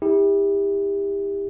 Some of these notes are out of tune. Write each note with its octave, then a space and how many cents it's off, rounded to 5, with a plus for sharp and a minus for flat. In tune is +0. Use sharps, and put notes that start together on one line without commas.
E4 -30 G4 +30